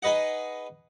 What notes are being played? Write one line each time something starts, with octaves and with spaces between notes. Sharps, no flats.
D#4 G#4 B4 D#5 F#5